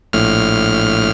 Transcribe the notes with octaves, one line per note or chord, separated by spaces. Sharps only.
A#1 A2 F6